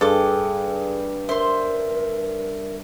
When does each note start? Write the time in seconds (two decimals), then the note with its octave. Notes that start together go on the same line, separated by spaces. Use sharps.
0.01 G2 G#4 A4 D6
1.29 A#4 C5 E5 C6